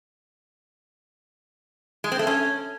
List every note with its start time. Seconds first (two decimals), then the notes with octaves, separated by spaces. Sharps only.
2.04 G#3
2.12 C4
2.19 A3
2.27 C#4